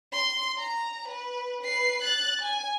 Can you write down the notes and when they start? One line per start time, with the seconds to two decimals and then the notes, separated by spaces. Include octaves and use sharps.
0.12 C6
0.58 A#5
1.08 B4
1.61 B4 C7
2.01 F#6 A6
2.41 G#5